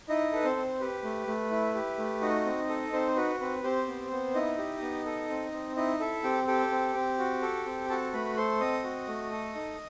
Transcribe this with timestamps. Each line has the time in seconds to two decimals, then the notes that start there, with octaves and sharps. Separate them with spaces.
0.09 D#4 E4 D#5
0.32 A4 B4
0.44 C4 C5
0.56 C4
0.80 G4 B4
1.04 A3
1.27 A3
1.51 E4
1.75 G4
1.98 A3
2.21 D#4 F#4 D#5
2.45 C4
2.69 A4
2.93 C4 D#4 C5
3.16 F#4 B4
3.40 C4 B4
3.63 C4 G4 C5
3.88 B3
4.11 B3
4.35 D#4 E4 D#5
4.58 G4
4.82 B3
5.06 A4
5.30 C4
5.52 C4
5.77 D#4 E4 D#5
6.00 E4 A4 E5
6.24 C4 G4 G5
6.47 G4 A4 G5
6.71 C4
6.95 C4
7.19 F#4
7.42 A4
7.66 C4
7.89 F#4 A4 A5
8.13 A3 B4 B5
8.37 A4 C5 C6
8.60 C4 D#5 D#6
8.84 F#4
9.08 A3
9.31 A4
9.55 D#4